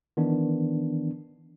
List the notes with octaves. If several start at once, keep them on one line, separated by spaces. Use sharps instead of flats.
D#3 E3 B3 D4